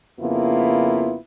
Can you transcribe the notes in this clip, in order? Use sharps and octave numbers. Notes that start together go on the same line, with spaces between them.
F2 C#3 A#3 B3 E4 F4